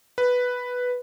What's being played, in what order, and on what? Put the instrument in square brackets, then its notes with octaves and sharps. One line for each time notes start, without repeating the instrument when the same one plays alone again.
[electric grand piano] B4